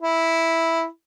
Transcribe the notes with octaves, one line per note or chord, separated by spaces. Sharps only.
E4